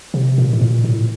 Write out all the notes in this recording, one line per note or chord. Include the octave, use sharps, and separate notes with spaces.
C3
A#2
A2
A#2
A2